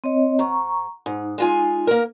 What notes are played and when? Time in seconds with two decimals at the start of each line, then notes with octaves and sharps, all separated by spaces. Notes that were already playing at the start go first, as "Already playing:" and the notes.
0.04 C4 C#5 D#5
0.39 G#2 A#5 C#6
1.06 G#2 D#4
1.38 G#3 F4 G#5
1.87 A#3 A#4